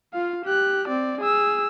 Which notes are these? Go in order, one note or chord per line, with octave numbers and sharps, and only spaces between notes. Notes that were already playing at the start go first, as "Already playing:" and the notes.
F4 F5
G4 F#6
C4 D5
G#4 E6